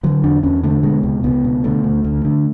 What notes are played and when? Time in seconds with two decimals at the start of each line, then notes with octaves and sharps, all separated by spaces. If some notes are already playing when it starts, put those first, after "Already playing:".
0.03 D3 F#3
0.24 E2 D4
0.43 E2 C#4
0.63 D3 A3
0.83 B2 G#3
1.03 C#2
1.24 C#2 B3
1.44 B2
1.64 D3 A3
1.84 D2
2.04 D2
2.25 D3